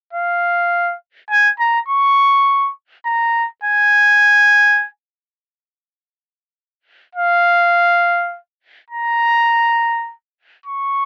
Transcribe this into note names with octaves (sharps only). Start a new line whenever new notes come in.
F5
G#5
A#5
C#6
A#5
G#5
F5
A#5
C#6